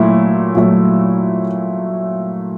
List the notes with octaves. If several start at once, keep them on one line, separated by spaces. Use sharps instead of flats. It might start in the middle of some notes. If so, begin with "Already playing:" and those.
Already playing: A#2 F#3 A3 E4
A#2 F#3 A3